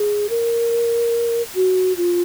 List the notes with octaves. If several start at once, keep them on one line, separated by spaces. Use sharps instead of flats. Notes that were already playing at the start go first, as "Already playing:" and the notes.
Already playing: G#4
A#4
F#4
F4